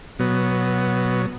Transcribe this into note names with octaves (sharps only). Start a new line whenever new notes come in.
B2 F#3 B3